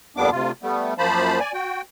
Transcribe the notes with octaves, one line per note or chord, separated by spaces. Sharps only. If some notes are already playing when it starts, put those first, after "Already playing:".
F2 A#2 G3 B3 D4 D6
D2 C3 F4
G3 A3 B3
F#2 F3 A#3 C5 A5 B5
D5 G#5
F#4 G5